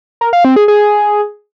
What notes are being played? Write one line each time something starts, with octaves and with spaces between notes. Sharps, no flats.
A#4
F5
C4
G#4
G#4